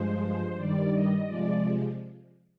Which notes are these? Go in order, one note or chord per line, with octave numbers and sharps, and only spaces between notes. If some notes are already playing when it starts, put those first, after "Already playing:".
Already playing: G2 F3 G#3 C5
G2 D#3 G3 D5
D#5
C3 F3 G#3 D5